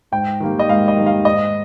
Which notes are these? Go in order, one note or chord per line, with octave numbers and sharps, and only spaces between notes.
G#2 G5
D#3 G3 A#3
D#5
G#2 F5
D#5
D#3 G3 A#3
F5
G#2 D#5